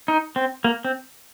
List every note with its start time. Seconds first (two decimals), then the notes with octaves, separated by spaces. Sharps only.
0.08 D#4
0.36 C4
0.64 A#3
0.85 C4